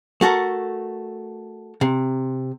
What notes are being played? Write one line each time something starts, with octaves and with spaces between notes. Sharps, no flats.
A3 F#4 A4 A#4
C3